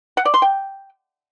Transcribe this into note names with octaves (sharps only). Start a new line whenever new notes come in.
F#5
D5
C6
G5